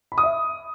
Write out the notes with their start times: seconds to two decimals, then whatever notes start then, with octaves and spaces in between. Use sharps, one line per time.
0.12 B5
0.18 D#6
0.23 E5